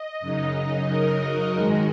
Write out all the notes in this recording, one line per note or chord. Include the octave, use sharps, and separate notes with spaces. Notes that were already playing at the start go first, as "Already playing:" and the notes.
Already playing: D#5
F#2 C#3 F#3 D#4
A#4
F#4
G#2 D#3 G#3